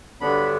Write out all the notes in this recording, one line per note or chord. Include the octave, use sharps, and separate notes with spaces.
G2 D3 F#3 B3 D4 B5